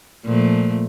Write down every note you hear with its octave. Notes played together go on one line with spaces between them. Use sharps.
A#2 F3 A3